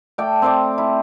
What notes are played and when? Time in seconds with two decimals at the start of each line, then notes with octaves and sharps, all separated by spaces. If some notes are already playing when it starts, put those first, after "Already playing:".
0.18 A3 D5 G5
0.42 C4 C5 D5
0.78 E4